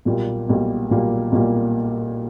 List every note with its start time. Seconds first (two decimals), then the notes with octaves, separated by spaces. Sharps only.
0.05 B1 A#2 G3 A#3
0.48 B1 A#2 G3 A#3
0.91 B1 A#2 G3 A#3
1.32 B1 A#2 G3 A#3